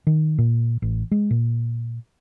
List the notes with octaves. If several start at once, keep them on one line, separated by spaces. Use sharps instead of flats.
D#3
A#2
A1
G#3
A#2